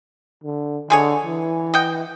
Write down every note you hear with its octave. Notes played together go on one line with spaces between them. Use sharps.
D3
D3 G#3 G#4 C#5
E3
D#5 F#5 G5